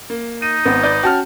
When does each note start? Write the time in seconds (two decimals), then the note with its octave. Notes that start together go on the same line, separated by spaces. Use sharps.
0.10 A#3
0.42 D#4 D#7
0.65 G#1 B3 C4
0.83 B4 D5 G6
1.03 C#4 F#4 G5 A5 F6